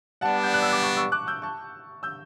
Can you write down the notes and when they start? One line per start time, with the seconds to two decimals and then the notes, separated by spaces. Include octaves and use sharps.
0.21 G3 B3 D4 F#5 A5
0.43 G6
0.54 F#6
0.62 E6
0.73 D6
0.82 A5 C#6
0.97 C#6 E6
1.12 D6 F#6
1.27 E6 G6
1.42 A5 C#6
2.03 E6 G6